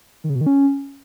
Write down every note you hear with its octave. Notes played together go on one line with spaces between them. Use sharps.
D#3
C#3
B2
D#3
C#4